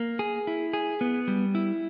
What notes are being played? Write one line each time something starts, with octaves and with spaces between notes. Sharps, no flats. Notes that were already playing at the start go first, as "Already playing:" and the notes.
Already playing: A#3
G#4
E4
G#4
B3
G3
E4